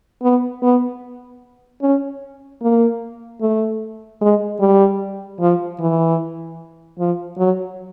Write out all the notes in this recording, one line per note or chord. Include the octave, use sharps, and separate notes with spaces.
B3
B3
C#4
A#3
A3
G#3
G3
F3
E3
F3
F#3